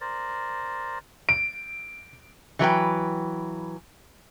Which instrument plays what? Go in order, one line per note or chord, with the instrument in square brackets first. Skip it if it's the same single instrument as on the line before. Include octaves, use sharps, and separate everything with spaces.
[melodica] A#4 C5 D5
[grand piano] D7
[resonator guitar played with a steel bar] E3 F#3 B4 G5